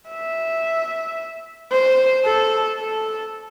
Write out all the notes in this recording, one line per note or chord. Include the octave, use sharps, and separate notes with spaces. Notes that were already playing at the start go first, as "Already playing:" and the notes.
E5
C5
A4
A4